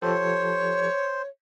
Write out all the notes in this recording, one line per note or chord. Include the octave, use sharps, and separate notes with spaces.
F3 G4 A4 C5 C#5